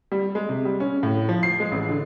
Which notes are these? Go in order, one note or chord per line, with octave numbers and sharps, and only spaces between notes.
G3
G#3
C3
G3
C#4
A2
F3
C7
G#3
A1
D3